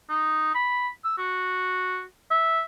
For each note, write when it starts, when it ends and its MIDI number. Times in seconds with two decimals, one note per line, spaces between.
0.10 0.52 63
0.55 0.88 83
1.04 1.15 88
1.18 2.03 66
2.31 2.62 76